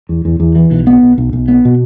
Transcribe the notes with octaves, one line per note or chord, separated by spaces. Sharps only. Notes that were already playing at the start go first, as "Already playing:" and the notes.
E2
E2
E2
E3
B1
B3
B1
B1
B1
B3
B2